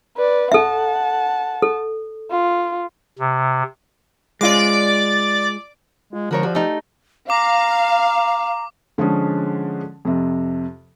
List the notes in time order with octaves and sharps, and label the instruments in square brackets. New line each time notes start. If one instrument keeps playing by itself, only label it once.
[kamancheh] B4 D5
[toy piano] A4 E5 [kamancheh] F#5 A5
[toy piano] A4
[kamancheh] F4
[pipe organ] C3
[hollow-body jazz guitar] G#3 F4 [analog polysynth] D5 D6
[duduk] G#3 [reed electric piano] F4
[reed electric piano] D3 G#3 [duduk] F3 [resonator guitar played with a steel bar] F#4 A#4 C#5
[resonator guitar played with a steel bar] F#4 [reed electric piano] G4 D5
[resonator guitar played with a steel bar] A3 D#4 [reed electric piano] G4
[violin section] F5 [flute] A#5 [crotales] D6
[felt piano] D3 F3 G#3 C#4
F2 C3